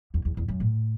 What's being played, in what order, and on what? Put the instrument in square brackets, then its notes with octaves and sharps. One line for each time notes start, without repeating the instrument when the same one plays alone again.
[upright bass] E2
E2
E2
F#2
A2